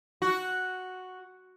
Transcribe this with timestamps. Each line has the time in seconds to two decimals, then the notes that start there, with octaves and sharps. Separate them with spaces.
0.22 F#4